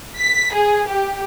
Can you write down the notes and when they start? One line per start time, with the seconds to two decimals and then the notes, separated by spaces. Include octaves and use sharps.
0.18 B6
0.54 G#4
0.88 G4